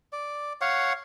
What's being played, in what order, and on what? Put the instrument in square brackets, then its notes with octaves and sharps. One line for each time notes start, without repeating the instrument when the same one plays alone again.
[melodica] D5
C#5 F5 F#5